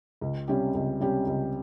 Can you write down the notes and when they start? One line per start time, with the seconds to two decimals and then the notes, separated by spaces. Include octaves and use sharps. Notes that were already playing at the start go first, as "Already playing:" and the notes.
0.21 C#2
0.48 C3 G3 C#4 G4
0.75 C#2
1.00 C3 G3 C#4 G4
1.26 C#2